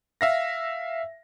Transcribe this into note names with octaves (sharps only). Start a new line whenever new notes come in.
E5 F5 A#6